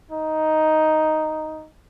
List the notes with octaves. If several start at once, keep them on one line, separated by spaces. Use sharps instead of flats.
D#4